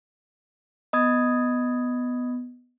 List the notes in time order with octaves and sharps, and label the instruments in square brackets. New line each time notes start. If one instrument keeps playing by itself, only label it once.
[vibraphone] B3 [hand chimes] D#5 D#6 G#6